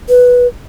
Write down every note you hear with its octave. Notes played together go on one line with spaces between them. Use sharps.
B4